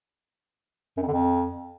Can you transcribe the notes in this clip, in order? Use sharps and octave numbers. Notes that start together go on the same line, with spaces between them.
F#2
F2
D3
F2